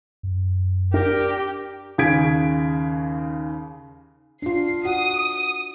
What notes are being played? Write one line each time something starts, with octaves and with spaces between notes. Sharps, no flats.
F#2
D4 G4 A#4 G5
D#2 C#3 G#4 G#6 B6 D7
D4 F4 C7
F#4 F#5 D#6